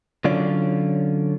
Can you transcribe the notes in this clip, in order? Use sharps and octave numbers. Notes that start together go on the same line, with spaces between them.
D3 F#3 C#4 F4 D5